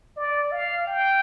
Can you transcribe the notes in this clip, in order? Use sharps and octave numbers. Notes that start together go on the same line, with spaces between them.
D5
F5
G5